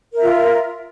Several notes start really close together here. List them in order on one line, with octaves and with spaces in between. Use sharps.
A#4 E5 F4